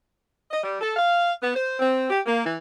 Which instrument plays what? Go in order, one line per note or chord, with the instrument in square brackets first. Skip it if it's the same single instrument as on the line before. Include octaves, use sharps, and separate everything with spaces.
[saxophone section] D#5
G3
A4
F5
B3
C5
C4
G4
A#3
E3